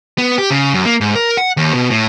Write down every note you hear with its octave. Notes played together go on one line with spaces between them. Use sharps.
B3
G4
C#3
F#2
A#3
G#2
A#4
F#5
D#2
B2
A2